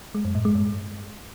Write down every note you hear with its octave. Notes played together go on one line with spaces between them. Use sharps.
G#3
F#2
A2
G#3
G2